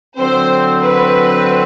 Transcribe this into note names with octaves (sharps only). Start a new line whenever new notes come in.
D3 F#3 C4 C5
B4